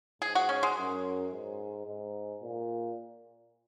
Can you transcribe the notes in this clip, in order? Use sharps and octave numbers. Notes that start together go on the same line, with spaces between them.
G#2 G#4
F#4
C#4
G#3
F#2
G#2
G#2
A#2